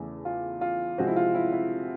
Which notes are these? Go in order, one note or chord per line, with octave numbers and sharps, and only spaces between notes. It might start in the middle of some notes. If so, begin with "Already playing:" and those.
Already playing: E2 C#3 E3 A3
F4
F4
C3 F3 G#3 C4 F#4
E4
F4
E4
E4